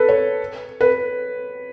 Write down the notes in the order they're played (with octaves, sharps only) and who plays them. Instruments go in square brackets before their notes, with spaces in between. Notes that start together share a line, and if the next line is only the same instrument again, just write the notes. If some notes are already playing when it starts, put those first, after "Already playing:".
Already playing: [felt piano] A4 B4
C#5
B4